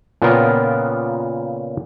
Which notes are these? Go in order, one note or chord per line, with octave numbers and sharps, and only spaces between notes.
A#2 C#3 B3 F4 A#4 G5